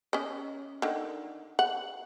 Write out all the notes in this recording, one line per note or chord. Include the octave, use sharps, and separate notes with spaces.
C#4 D#5
D3 D#3
F#5